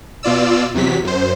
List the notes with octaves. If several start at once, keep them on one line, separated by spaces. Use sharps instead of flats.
B2 F4 D5 E6
E2 C3 F#3 B6
F#2 C5